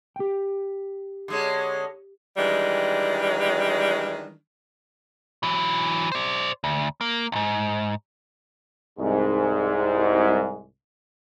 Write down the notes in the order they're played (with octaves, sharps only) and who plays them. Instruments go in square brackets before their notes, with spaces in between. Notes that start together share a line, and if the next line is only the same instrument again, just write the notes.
[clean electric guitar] G4 G5
[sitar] D3 G#3 C#4
[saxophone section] D#3 E3 G3 G#3 D4
[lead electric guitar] E3 F#3
C5 D5
D2
A#3
C2 G#2
[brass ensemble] C2 G#2